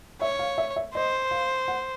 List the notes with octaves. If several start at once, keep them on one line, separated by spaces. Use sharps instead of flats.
C#5 E5
F5
E5
E5
C5 D#5
F5
F#5